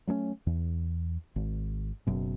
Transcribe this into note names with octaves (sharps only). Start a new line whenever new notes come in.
F#3 A3 B3 C#4
E2
G#1
F#1 F#2 B2